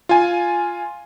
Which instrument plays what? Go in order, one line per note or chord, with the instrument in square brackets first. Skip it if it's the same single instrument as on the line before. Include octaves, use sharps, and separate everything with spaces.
[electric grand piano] F4 G#5